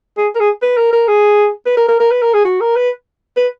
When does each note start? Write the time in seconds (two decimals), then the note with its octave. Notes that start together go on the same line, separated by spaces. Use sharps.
0.18 G#4
0.35 A#4
0.40 G#4
0.62 B4
0.77 A#4
0.93 A#4
1.08 G#4
1.66 B4
1.77 A#4
1.88 A#4
2.00 A#4
2.11 B4
2.22 A#4
2.33 G#4
2.45 F#4
2.61 A#4
2.76 B4
3.37 B4